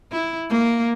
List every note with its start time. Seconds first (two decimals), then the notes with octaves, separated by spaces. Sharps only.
0.12 E4
0.50 A#3